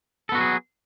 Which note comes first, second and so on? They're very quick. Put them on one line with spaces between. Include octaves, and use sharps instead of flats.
A4 B3 F#4 F#3 G#4